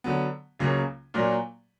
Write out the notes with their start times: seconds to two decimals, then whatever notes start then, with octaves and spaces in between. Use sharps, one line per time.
0.04 D3 F#3 B3
0.59 C#2 C#3 F#3 A#3 C#4
1.14 A#2 F#3 A#3 D4